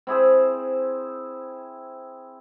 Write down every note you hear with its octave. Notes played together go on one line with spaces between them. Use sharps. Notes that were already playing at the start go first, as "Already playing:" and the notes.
C4 E4 G#4 C5